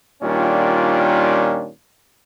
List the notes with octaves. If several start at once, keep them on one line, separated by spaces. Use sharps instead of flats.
A#2 D#3 G3 C#4 D4 F4